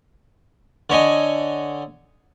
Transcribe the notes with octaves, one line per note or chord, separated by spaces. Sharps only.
D3 C#5 D#5 G#5